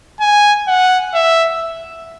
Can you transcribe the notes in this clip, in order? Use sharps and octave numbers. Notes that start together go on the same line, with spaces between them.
G#5
F#5
E5